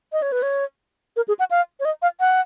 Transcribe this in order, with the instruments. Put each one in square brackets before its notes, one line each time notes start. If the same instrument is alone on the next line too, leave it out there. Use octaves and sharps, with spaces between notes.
[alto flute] D#5
C#5
B4
C#5
A#4
G#4
F#5
F5
C#5
D#5
F5
F#5